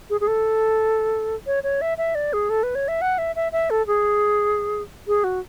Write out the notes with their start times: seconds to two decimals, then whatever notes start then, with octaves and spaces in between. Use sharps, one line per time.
0.10 G#4
0.21 G#4
0.27 A4
1.47 C#5
1.64 C#5
1.81 E5
1.98 E5
2.15 D5
2.33 G#4
2.50 A4
2.63 B4
2.75 C#5
2.88 E5
3.02 F#5
3.18 E5
3.36 E5
3.52 E5
3.70 A4
3.87 G#4
5.08 G#4
5.24 F#4